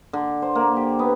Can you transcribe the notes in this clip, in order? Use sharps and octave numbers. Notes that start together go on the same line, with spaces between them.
D3
C5
A#3
G4
B3